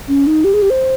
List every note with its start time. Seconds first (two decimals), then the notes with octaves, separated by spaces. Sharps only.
0.08 C#4
0.27 D#4
0.44 G4
0.54 G#4
0.62 G4
0.70 C5